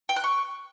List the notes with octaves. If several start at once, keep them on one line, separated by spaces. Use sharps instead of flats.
G5
F#6
C#6